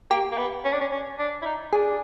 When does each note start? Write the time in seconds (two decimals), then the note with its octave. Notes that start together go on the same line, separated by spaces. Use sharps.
0.10 A#3 G4
0.31 A#3
0.38 B3
0.64 C#4
0.73 D4
0.81 C#4
0.91 C#4
1.19 D4
1.42 E4
1.45 D#4
1.73 D4 G#4